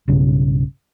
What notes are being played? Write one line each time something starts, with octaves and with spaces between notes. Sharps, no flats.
B1 G2 C#3